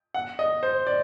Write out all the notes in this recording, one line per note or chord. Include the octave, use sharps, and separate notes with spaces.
F#5
D#5
C5
D5